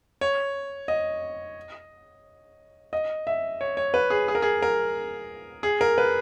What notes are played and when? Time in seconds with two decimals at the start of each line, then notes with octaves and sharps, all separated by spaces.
0.21 C#5
0.88 D#5
2.93 D#5
3.27 E5
3.61 C#5
3.77 C#5
3.94 B4
4.10 G#4
4.28 G#4
4.35 A#4
4.42 G#4
4.62 A#4
5.63 G#4
5.81 A#4
5.98 B4